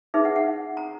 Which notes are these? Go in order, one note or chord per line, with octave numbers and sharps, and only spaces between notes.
D#4 G#4 B4 E5
F#5
F#5
A#5